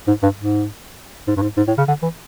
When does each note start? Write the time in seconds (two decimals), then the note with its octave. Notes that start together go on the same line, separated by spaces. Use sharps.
0.08 G#2
0.23 G2
0.38 G#2
1.28 G#2
1.36 G2
1.42 G#2
1.57 G#2
1.68 A2
1.78 C#3
1.88 D3
2.02 E3